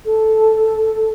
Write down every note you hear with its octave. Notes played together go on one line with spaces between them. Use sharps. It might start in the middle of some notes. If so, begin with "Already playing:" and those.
A4